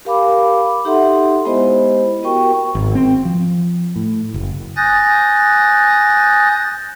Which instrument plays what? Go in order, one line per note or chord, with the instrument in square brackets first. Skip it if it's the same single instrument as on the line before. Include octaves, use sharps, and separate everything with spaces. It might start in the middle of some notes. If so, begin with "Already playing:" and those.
[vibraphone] G4 A#4 F5 G#5 B5 D6
D#4 G4 A4 E5 F#5 C6
G#3 B3 E4 G4 C5 D#5
B3 F#4 G4 A#4 G5 C#6
[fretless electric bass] G#1
C4
F3
A2
F#1
[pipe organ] G#5 D#6 F#6 G6 A6 A#6